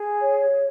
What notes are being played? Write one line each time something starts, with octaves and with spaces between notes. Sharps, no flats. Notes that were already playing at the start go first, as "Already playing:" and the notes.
Already playing: G#4
C#5